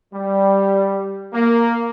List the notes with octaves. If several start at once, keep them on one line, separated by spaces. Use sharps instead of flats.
G3
A#3